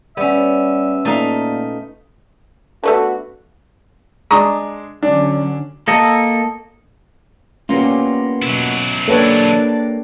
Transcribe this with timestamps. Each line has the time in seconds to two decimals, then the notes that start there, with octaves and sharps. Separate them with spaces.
0.17 G3 B3 C#4 E5
1.05 A#2 A3 D#4 F5
2.84 A3 B3 D4 F#4
4.31 G#3 D4 A#5 C#6 D#6
5.03 D3 F#3 C#4 D4
5.88 A#3 A4 D#5
7.69 A#3 B3 C#4 F4 G4
8.42 B2 F#3 E4
9.08 A#3 D4 G4 A4 B4 C#5